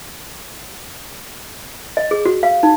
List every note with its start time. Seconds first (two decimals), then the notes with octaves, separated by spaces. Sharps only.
1.97 D#5
2.11 G#4
2.26 F#4
2.43 F5
2.63 D#4